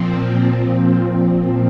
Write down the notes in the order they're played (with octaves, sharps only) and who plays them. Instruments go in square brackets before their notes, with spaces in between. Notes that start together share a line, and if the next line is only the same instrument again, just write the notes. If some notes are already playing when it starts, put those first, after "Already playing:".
Already playing: [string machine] A#2 F3 C4